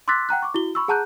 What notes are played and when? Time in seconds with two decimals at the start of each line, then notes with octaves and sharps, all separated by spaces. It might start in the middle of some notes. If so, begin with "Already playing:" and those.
0.08 C6 D6 E6 F#6 A6 B6
0.29 F#5 G5 A#5 F#6
0.42 C#6 D6
0.54 E4 F#4 G7
0.75 B5 C#6 E6
0.88 G#4 F#5 A5 A#5 F#6 G6